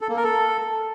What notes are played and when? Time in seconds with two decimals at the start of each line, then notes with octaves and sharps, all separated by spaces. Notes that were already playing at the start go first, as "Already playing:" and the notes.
0.01 A4
0.09 A#3
0.17 A#4
0.24 A4